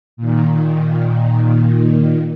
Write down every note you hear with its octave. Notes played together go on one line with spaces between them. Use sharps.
A#2 D#3